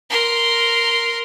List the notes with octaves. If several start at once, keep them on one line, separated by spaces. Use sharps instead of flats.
A#4 C6